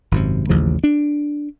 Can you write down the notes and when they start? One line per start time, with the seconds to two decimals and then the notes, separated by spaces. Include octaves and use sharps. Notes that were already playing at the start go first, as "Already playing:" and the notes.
0.12 G#1 F#2 C3
0.49 A1 D#2 C#3 F3
0.84 D4